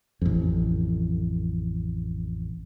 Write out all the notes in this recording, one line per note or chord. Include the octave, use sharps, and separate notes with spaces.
A1 F2